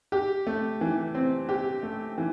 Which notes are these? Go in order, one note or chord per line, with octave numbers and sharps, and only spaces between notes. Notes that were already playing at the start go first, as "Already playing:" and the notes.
G4
A3
E3
C4
G4
A3
E3